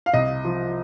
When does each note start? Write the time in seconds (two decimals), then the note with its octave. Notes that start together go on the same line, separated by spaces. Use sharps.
0.06 F5
0.13 C2 D#5
0.45 F3